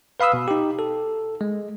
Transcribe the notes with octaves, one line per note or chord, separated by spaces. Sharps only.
B4 F5 B5 D#6 E6
B2
D#4 G4
A4
G#3